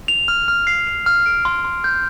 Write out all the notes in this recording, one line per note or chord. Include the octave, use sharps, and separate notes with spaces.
F7
F6
F6
C7
F7
F6
D7
C6
C6
G6